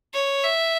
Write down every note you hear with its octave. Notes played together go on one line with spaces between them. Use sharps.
C#5
E5